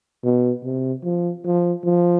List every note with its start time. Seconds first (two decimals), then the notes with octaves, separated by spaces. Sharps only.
0.24 B2
0.65 C3
1.04 F3
1.45 F3
1.85 F3